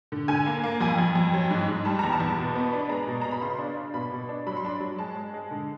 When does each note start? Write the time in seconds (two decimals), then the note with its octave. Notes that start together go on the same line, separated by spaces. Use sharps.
0.12 D3
0.28 D3 G#5
0.46 A#3
0.64 A#3
0.81 F2 G#5
0.99 F2
1.15 F2
1.34 F#3
1.51 G#2
1.68 G#2
1.85 G3 A5
1.99 E2 A#5
2.13 A5
2.20 E2
2.38 B2
2.55 B3
2.73 D4
2.89 G#3 A#5
3.07 B2
3.21 B2 A#5
3.31 B5
3.42 C#3 C6
3.59 D4
3.77 D4
3.94 B2 B5
4.12 B2
4.29 D4
4.47 F#3 B5
4.57 C6
4.64 D4 B5
4.80 F#3
4.98 G#3 A5
5.15 G#3
5.34 G#3
5.51 D3